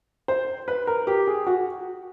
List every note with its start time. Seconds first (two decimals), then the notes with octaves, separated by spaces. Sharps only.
0.28 C5
0.68 B4
0.87 A#4
1.07 G4
1.27 G#4
1.47 F#4